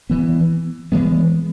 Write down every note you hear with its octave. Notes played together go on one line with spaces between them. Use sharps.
E3 B3
E3 G#3 B3